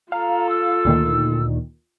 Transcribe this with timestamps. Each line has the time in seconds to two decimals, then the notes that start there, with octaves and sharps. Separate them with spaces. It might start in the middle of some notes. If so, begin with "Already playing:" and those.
0.12 F4 A4 F5 A#5
0.49 E6
0.85 D2 A#2 D#3